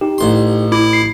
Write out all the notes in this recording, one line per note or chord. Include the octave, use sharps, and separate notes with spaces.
D#4 G4
A1 C6
E4 D6
C7